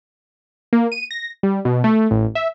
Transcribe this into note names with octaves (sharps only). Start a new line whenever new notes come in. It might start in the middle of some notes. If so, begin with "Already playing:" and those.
A#3
D#7
A#6
G3
B2
A3
A1
E5